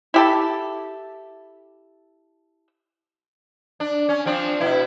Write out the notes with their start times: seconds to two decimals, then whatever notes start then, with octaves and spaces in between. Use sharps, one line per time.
0.14 E4 G4 A4
3.80 D4
4.09 C#4
4.26 F3 C4 D4
4.60 B2 E4